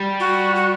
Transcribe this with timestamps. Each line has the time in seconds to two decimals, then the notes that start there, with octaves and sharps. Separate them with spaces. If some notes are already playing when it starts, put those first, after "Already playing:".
Already playing: G3
0.19 F#4
0.55 F#4